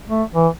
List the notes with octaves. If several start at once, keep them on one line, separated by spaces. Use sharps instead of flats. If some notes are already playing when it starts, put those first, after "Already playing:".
A3
E3